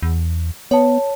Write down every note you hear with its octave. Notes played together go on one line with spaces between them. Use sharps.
E2
B3 C#5 A5